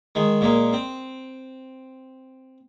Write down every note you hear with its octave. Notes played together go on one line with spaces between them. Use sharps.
D#3 G#3
A#2 G#3 A#3
C4